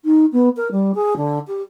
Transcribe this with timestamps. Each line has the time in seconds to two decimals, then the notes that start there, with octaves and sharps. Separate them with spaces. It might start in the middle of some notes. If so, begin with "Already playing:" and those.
0.04 D#4
0.32 B3
0.56 A#4
0.71 G3
0.94 G#4
1.16 D3
1.47 G4